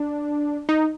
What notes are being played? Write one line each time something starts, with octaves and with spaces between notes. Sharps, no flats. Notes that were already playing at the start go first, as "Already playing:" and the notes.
Already playing: D4
D#4